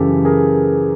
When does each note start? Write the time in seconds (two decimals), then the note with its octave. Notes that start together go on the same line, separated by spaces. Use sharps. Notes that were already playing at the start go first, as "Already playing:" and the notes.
Already playing: F#2 C#3 E3 G4 A4
0.25 G#4 A#4